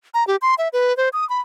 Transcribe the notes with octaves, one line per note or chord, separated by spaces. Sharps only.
A#5
G4
C6
E5
B4
C5
D#6
B5